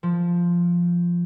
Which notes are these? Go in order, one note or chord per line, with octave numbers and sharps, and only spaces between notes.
F3